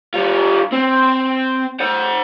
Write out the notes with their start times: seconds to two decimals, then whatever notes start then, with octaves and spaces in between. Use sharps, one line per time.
0.14 G3 F4
0.72 C4
1.80 C5 F#5